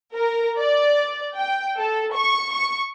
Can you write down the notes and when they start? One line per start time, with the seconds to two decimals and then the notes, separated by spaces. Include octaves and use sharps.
0.15 A#4
0.59 D5
1.36 G5
1.78 A4
2.15 C#6
2.54 C#6